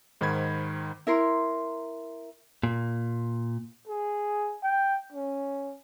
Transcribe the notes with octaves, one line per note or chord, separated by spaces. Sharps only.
G#2 D#3 C5 B5 G#6
E4 A#4 C6
A#2
G#4
G5
C#4